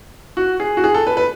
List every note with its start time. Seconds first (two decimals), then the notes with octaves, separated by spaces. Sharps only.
0.37 F#4
0.60 G#4
0.77 F#4
0.84 G#4
0.94 A4
1.07 B4
1.17 B4